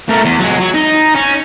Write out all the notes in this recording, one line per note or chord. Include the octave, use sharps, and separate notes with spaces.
A3 A#4
E2
F#3 G#3
F#3
D#4
C#4